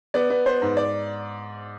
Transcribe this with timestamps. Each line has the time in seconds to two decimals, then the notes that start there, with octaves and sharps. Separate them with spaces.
0.14 B3 D5
0.30 B3
0.46 B3 C5
0.62 G#2
0.77 D5